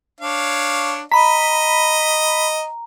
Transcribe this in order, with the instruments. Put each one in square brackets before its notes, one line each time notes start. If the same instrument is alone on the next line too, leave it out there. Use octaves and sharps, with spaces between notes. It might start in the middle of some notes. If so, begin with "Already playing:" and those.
[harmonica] D4 C#5 F5
[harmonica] D#5 [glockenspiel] A#5 [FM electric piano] B5 B6